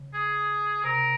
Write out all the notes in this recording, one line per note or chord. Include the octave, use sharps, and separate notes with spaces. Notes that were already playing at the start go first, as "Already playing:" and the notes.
Already playing: C#3
G#4
C3 A#4